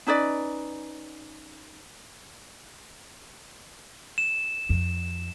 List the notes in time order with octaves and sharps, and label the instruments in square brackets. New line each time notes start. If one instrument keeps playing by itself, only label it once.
[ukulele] C#4 D#4 B4 D5
[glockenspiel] E7
[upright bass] F2